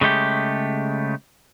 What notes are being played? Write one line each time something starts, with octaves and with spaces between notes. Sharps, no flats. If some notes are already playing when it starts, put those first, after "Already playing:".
C#3 G#3 A3 G4